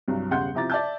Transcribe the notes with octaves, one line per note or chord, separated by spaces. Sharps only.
C2 G2 F#3
E1 C#3 G3 F#5 C6 G6
C3 F3 E4 A#5 D6 A6
D5 E5 A5 E6 G6